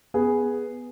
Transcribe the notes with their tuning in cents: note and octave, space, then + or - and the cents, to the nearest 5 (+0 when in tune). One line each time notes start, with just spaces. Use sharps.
B3 +0 G#4 +0